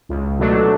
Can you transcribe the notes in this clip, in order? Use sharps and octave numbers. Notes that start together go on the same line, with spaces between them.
C#2
B2 F#3 A3 D4